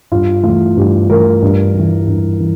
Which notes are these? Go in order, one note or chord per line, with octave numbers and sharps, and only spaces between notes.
G2 F4
E3 A3 F4
G2 G4
E3 A3 A#4
G2
E3 G3
G2
E3